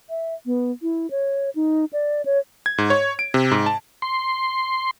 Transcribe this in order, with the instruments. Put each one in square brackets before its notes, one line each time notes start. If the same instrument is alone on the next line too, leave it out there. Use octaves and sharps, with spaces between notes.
[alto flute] E5
B3
E4
C#5
D#4
D5
C#5
[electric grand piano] G#6
G#2
C#5
D7
C3
G#2
A5
[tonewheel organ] C6